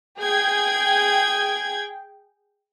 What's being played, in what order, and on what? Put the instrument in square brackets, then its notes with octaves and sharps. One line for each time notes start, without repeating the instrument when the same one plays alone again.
[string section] G#4 G5 G#6